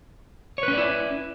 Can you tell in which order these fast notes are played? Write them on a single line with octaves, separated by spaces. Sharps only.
C#5 B4 C#4 D5 E4